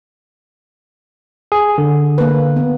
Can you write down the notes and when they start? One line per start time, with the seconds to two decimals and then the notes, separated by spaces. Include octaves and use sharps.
1.52 G#4
1.78 D3
2.18 A#3 B4
2.56 B3